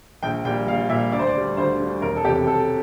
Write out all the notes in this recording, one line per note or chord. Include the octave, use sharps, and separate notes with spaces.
A#1 G5
A#2 G3 G5
A#1 F5
A#2 G3 E5
D2 D5
C5
D5
D3 G3
D2 C5
D3 G3
E1 A#4
A4
E2 C3 G4
E1 A4